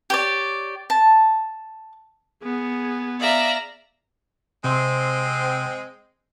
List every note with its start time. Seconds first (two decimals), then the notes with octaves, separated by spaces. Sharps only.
0.10 G4 C#5 D5
0.90 A5
2.43 B3 G#4
3.20 D5 E5 F5 A#5
4.64 C3 G#3 C4 C6